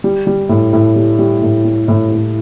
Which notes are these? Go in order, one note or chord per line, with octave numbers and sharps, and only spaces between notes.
G3
G3
A2
A2
G3
G3
A2
G3
A2
A2